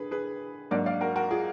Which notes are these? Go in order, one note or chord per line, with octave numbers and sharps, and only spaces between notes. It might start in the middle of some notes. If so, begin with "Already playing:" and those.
Already playing: D3 G#4 B4
G#4 B4
G#2 F#3 A#3 D4 A#4 D5
D5 F5
F#4 A#4
F#4 A#4
F4 G#4